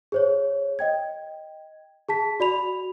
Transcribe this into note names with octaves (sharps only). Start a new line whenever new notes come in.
G#4 C5 C#5
D#5 G5 G#6
G#4 A5 B6
F#4 D5 B5 F7